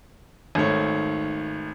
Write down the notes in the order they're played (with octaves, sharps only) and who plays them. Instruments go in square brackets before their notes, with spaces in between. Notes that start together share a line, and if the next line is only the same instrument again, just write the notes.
[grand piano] G#1 D#3 A3 C#5